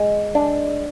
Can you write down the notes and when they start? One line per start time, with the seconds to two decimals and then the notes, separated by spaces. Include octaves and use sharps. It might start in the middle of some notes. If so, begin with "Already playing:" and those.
Already playing: G#3
0.35 D4